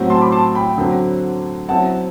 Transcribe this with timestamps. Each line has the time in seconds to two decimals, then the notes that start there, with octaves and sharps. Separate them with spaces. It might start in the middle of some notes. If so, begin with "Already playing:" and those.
Already playing: A2 F#3 C4 F#4
0.10 A5 C6
0.21 B5 D6
0.32 A5 C6
0.55 G5 B5
0.78 D3 F#3 C4 F#4
1.69 F#3 C4 E4 F#5 A5